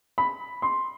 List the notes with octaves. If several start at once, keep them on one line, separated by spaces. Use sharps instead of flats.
B5
C6